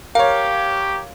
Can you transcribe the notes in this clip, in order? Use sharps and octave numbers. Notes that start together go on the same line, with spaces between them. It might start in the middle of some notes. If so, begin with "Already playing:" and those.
G4 A#4 C#5 F5